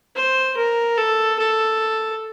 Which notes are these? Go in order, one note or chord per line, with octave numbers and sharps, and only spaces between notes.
C5
A#4
A4
A4